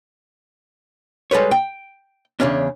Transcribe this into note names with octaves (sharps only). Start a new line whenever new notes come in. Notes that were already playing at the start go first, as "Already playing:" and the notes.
G3 G#3 A4 B4 C#5
G5
E2 G#2 C#3 C#4 D4